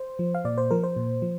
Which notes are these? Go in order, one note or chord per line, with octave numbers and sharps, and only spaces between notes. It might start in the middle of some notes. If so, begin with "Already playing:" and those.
Already playing: C5
F3
F5
A#2 D5
C5
F3 A#4
C5
A#2
F3